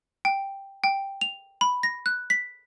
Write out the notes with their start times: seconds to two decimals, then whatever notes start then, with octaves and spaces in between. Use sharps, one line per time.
0.25 G5
0.84 G5
1.21 F7
1.61 B5
1.83 A#6
2.06 F#6
2.30 B6